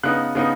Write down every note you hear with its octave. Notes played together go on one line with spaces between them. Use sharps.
C#3 B3 D#4 F#6
C#3 B3 D#4